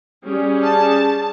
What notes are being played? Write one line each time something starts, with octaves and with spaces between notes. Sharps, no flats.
G3 C#4 G#4
A5